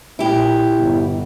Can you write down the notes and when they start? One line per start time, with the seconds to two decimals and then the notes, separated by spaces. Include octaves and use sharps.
0.19 A#2 E4 G4
0.77 G1